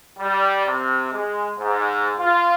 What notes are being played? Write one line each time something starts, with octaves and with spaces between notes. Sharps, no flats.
G3
C3
G#3
G#2
F4